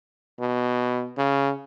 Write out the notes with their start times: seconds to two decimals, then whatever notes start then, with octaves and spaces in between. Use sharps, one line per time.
0.40 B2
1.18 C#3